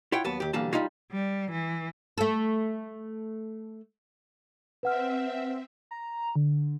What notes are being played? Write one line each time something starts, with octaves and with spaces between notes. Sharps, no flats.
E4 F4 C#5 F#5 G5
D#2 F#3 B3 A5
D#2 G4
B1 D3 E3 G3 A#3 A5
G3 G#3 D#4 F4
G3
E3
A3 A4
C4 B4 E5 F#5 F6
A#5
D3